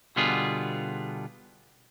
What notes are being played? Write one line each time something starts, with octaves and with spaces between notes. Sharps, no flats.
B2 D3 G3 B3 F4 G#4